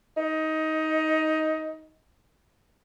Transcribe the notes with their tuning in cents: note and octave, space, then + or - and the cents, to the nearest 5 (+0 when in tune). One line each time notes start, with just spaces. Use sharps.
D#4 +15